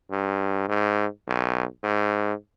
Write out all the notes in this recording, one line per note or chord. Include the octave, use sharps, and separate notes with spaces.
G2
G#2
B1
G#2